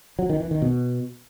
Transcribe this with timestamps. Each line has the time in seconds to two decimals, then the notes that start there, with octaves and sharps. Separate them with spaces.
0.19 F#3
0.29 D#3
0.40 E3
0.51 D#3
0.62 B2